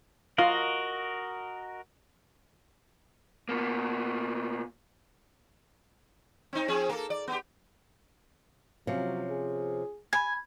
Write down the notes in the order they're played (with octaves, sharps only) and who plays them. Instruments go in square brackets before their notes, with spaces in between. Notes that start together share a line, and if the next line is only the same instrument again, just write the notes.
[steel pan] F4 F5 [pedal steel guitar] F#4 A#4 D#5
[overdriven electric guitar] B2 A#3
[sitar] C4 D#4
F3 C4 G#4
A#3 A4
D5
B3 G4
[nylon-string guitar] C3 F3 C#4 [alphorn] F#3
[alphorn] G#4
[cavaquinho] G#5 [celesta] B5 G#6